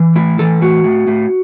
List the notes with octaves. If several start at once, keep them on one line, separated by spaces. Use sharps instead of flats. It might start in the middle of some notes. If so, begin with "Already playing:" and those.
Already playing: E3
A2 E4
E3 A4
A2 F#4
A2
A2